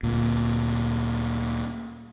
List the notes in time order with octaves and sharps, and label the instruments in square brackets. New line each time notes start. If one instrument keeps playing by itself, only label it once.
[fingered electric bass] D2 A#2